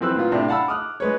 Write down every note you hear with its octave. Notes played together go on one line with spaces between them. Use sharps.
F#2 E3 C4 B4 E6 F#6
A#2 B3 F4
A2 C3 D4
F5 F#5 A5 B5 E6
D6 D#6 F6 F#6
G#3 B4 C#5